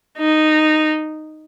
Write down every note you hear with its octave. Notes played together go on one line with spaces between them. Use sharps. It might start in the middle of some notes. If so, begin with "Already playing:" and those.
D#4